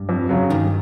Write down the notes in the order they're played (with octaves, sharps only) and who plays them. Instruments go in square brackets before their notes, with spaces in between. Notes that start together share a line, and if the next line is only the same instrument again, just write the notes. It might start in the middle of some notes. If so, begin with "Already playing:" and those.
Already playing: [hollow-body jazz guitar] G2
[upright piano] F2
C#3 F#3
[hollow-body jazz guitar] G2 [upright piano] D#3